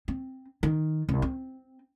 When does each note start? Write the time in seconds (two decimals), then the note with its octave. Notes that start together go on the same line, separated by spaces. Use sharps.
0.08 C4
0.63 D#3
1.09 C2
1.22 C4